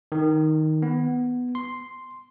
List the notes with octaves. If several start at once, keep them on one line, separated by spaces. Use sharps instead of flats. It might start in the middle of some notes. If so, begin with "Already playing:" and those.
D#3
B3
C6